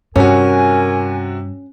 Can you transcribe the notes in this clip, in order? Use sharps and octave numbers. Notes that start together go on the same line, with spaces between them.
G2 C3 C#4 F#4 A#4 G#5